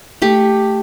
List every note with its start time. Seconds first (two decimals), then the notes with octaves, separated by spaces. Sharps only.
0.22 A3 G4